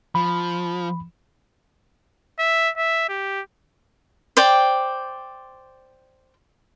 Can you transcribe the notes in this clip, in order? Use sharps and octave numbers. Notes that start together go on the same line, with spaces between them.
F3 B5
E5
E5
G4
C5 D5 G5